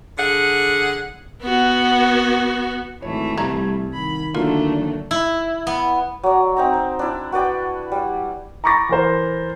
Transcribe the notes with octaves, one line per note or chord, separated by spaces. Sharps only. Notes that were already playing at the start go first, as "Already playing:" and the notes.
D3 G#4 F#5
B3 F#4
G#1 E3 A3 C#5
C2 G3 E4 D5 A#5 G#6
D#3 B5
D3 F#3 A3 A#3 D4 F4 F#4
E4
B3
F#3 D5
C4 D#4 A#5
C5
D4 E4
F#4 B4 D5 G5
G3
A#5 B5 C#6 D6 A6 A#6
E3 A#4 C5